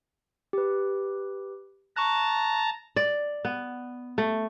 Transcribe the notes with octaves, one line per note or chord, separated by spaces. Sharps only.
G4 B4
A5 A#5 C#6 F#6
D5
B3
A3